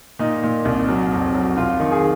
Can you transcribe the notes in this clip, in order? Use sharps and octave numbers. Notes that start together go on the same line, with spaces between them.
A#2 D#4
A#2
C2
F#3
F2
F#3
C2 F4
D#3
G#4